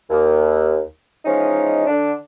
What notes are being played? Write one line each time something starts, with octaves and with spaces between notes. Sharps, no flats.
D#2
E3 F3 G#3 C#4 D#4
D3 D4